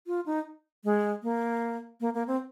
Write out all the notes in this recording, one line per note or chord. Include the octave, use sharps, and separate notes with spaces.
F4
D#4
G#3
A#3
A#3
A#3
C4